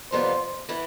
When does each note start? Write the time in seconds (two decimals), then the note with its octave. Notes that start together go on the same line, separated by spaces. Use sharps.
0.12 F2 C3 G3 B3 F4 C5
0.69 E3 B3 E4